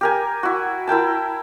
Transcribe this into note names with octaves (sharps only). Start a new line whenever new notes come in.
G4 A#4 G#5
E4 F#4
E4 A#4 G5 A5